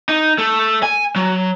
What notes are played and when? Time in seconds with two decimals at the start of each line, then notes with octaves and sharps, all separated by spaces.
0.09 D#4
0.38 A3
0.83 G#5
1.16 F#3